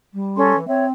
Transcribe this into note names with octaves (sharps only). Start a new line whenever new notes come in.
G3
C#4 A4 C6
E3
C4 C#5 E5